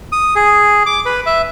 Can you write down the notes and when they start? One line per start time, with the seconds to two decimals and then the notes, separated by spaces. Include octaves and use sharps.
0.12 D#6
0.36 G#4
0.86 D6
1.06 B4
1.26 E5